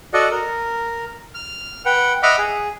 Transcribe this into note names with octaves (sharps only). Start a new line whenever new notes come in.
F#4 A4 D5 D#5 F#5
A#4
F6
B4 F#5 G5
D#5 E5 F#5 B5 D6 F6
G#4